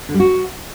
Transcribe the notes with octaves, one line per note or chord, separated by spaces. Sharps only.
D3
G3
F#4